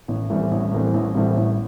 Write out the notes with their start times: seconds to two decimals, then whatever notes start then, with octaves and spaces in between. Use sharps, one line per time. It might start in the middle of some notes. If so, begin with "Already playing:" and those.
0.08 A1
0.30 A2 E3 G3 C4
0.51 A1
0.72 A2 E3 G3 C4
0.94 A1
1.14 A2 E3 G3 C4
1.35 A1